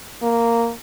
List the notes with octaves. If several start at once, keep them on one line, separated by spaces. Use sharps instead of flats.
A#3